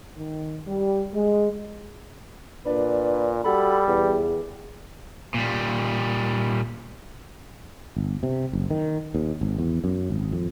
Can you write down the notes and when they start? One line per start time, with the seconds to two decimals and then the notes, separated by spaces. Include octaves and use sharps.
0.16 D#3
0.67 G3
1.13 G#3
2.66 A#2 D4 B4
3.45 G3 F#4 A4 B5
3.88 E2
5.34 A#2 G3
7.96 G1
8.23 C3
8.53 F#1
8.70 D#3
9.15 D#2
9.41 G#1
9.58 E2
9.84 F#2
10.10 G#1
10.32 F2